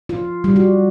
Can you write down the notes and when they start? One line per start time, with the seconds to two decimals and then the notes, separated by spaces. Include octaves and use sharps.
0.09 F4
0.44 G3
0.56 F#4